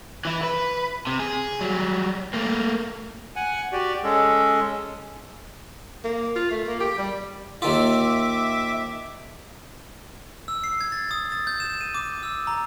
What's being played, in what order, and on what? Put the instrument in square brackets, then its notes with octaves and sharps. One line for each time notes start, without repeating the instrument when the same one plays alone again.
[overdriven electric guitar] E3 E4
B4
C3
G#4
F#3 G3
A3 A#3
[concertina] F#5 G#5
F#4 G4 D5
G#3 C#4 A4
[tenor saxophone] A#3
F4
A3
A#3
G4
G3
[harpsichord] D#2 D#3 F4 [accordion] E5 D6
[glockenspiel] E6
C7
G#6
A6
D#6
A6
G6
E7
D#7
D6
E6
A#5